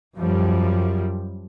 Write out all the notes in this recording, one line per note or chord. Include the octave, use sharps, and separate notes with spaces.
F#2 F3 G3